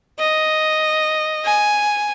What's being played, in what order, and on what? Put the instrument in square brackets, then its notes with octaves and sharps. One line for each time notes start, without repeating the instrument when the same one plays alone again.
[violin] D#5
G#5